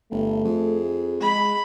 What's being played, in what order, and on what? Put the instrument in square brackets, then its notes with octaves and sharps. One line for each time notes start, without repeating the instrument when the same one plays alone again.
[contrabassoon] G1 [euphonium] A3
[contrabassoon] F2 [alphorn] G#4
[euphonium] G#3 [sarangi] B5